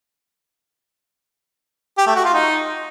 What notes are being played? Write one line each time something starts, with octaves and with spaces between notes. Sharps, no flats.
G4
A3
F#4
F4
D#4